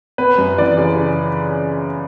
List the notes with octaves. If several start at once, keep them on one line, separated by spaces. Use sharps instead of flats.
B3 B4
F#2
E3 D5
C#3